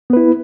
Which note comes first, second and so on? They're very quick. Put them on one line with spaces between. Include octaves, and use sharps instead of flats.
B3 B4 E4